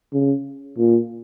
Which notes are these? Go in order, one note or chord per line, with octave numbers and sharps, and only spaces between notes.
C#3
A#2